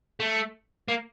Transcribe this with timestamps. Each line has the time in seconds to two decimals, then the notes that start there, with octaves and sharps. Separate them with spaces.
0.20 A3
0.88 A#3